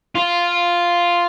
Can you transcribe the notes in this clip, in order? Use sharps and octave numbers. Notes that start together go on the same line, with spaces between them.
F4